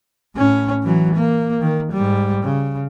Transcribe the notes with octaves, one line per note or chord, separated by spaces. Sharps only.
A2 C#4
E3 F#3
A#3
D#3
G#2 G3
C#3